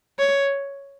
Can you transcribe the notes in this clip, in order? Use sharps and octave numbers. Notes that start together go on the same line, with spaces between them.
C#5